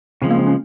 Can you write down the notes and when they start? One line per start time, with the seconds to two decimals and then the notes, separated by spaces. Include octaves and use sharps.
0.22 C#3 F3 G#3 C4
0.31 A#3
0.39 C4
0.47 C#4